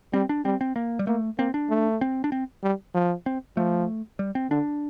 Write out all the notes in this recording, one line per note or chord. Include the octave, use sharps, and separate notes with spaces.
G3 C4
D4
G3 C4
C4
A#3
G3
A3 A#3
A#3 C4
D4
A3
C4
D4
C4
G3
F3
C4
F3 A3
G3
C4
D3 D4